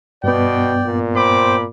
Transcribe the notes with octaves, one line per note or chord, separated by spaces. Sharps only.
G2 B2 B3 D5 G5
A#2
C5 G5 B5 D6